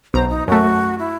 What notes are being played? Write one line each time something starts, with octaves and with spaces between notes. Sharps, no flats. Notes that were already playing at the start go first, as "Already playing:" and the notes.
B1 C5 A#5
D#4
F#2 A3 F#4
E4